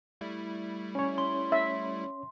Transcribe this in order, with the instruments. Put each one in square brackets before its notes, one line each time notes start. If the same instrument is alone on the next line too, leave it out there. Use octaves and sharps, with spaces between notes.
[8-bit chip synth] G3 A3 E4
[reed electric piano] C#4 C#5
[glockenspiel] C6
[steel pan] E5